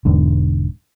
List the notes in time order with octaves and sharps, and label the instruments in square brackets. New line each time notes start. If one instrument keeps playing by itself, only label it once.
[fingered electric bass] E1 E2 G#2 D3